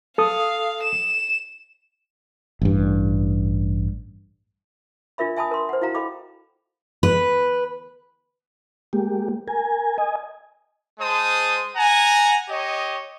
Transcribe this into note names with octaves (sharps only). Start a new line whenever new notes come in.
A4 F5 D#6
E7
A1 G2
D4 F4 A#4 E5 B5
E5 G#5 A5 B5 D#6
A#4 C6
C5 F#5
E4 F#4 F5 A#5
A4 D#5 G5 B5 D6
B4
G#3 A#3 G4
A#4 G#5
D#5 G#5
G#3 C5 A5 D#6
F#5 G#5 A#5
G4 C#5 D#5